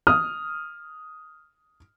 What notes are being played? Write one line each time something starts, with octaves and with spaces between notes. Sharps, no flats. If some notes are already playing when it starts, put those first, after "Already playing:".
D#6 F6